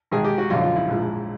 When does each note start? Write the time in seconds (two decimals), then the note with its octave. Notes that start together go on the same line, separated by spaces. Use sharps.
0.11 G#1 G#2 D#3 G#4
0.24 G4
0.38 F#4
0.50 G#1 F#2 D3 F3 F4
0.64 F4
0.76 E4
0.88 A#1 G#2 F3